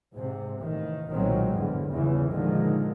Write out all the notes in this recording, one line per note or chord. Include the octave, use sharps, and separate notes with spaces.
G#2 C3
A1 D#3
B1 A#2 D#3 F#3 G#3 C4
G#1 E2 G2 D3
G1 E2 G2 C#3 E3
A#2 D3 D#3 F3 G#3